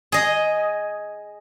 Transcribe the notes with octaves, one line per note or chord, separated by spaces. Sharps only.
G#4 D#5